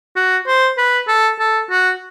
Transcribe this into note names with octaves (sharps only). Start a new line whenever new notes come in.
F#4
C5
B4
A4
A4
F#4